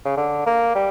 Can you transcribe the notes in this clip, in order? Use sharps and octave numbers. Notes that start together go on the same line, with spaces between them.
C#3
D3
A#3
G3